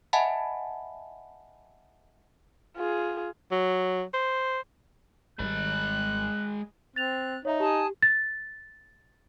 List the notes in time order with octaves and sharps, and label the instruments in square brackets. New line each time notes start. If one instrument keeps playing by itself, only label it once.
[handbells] D#5 E5 F#5 G#5 A5 B5
[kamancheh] F4 G#4
[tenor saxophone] F#3
C5
[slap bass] G#1 D#3 G3 [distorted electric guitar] G#3 B5 [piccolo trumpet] F#6
[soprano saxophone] C4 [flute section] F#6 [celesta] A6 F7
[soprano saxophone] D#4 [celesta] C#5 E5 A#5
[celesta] G4 [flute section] G#5 A5 D#6
[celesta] A6